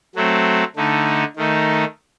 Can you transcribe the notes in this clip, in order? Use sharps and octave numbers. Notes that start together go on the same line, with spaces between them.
F#3 A3 C4
D3 A3 D#4
D#3 A3 D#4